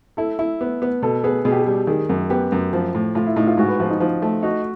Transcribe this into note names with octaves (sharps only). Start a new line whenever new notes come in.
E4 A4
E4
B3
B3
B2 A4
B3 G#4
B2 G#4
G4
G#4
G3
D#3 G#4
F#2
B3 G4
F#2
F3
A2
A2 F4
E4
A2 D#4
F4
G#2 F#4
B4
F3 F4
D#4
F3 D#4
A3 F4
D#4 F#4